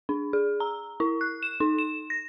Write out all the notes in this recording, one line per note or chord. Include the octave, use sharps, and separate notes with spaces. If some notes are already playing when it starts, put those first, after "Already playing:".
D4
G#4
A#5
E4
F#6
E7
D#4
E7
A#6